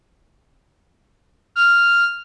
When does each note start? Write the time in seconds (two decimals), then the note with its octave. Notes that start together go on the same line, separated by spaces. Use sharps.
1.56 F6